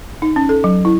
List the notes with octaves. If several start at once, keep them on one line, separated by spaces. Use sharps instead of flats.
D#4
C#4
A4
F#3
E4